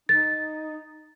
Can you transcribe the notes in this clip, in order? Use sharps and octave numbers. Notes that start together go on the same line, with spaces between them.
D#4 A6